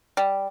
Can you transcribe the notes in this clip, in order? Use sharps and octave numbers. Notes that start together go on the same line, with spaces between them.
G3